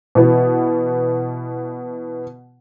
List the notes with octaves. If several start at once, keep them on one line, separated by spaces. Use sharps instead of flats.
B2 E3 B3